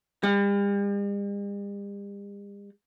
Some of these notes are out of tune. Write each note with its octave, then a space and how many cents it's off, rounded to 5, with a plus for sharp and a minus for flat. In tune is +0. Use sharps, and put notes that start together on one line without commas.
G3 +45